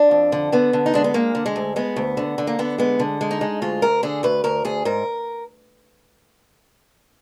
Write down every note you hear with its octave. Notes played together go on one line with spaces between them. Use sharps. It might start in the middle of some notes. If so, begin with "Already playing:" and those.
Already playing: D4
F2
D3
D3 B3
D3
D#4
G#3 D4
B3
G#3 A#3
D3
G#3
D2
G#3 B3
D2
D3
D3
A#3
D3 B3
G#3 B3
D3
G#3
D#4
G#3
D2 F4
D2 A#4
D3 G#4
D2 B4
D2 A#4
D2 G#4
G#2 A#4